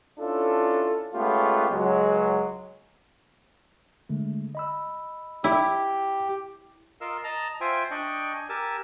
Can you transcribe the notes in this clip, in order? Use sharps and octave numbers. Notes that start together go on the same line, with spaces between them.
C#4 D4 E4 F4 A4
G#3 A3 B3 C#4 F4 G4
C#2 F#3 G#3
D3 G#3 A3
D#5 B5 E6
E4 G4
F4 A#4 D#5 F5 E6
D#5 A5 A#5
F4 C5 E5 G5 G#5
D4 D5 D#5 G5 C#6
G#5
G4 A#4 G#5 A5 E6